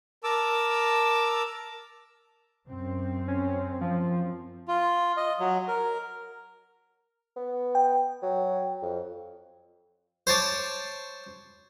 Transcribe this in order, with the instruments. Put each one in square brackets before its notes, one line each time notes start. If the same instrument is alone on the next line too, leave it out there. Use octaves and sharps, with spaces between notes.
[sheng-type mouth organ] A#4 A5 D6 E6
[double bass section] F#2 C4
[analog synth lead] C#4
F3
[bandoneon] F4
D#5
F#3
A#4
[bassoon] B3
[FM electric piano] G5
[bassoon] F#3
F2
[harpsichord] C5 C#5 A5 D6